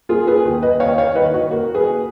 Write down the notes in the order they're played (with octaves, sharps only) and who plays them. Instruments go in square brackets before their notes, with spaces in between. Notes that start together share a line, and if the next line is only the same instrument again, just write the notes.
[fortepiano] A#3 F4 G#4
G#4 B4
D#2
B4 D#5
D#2 C#5 F5
C#5 F5
D#3 B4 D#5
F#4
A#3 F#4
G#4 B4